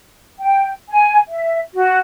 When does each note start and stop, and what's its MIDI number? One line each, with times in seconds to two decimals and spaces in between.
0.40 0.70 79
0.89 1.18 80
1.28 1.59 76
1.74 1.97 66